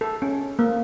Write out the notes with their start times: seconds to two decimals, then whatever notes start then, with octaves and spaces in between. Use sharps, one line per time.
0.01 A4
0.22 C#4
0.59 A#3